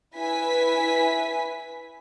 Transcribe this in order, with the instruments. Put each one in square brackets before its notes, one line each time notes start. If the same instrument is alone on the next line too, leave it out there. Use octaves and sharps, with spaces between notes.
[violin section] E4 B4 G#5 B6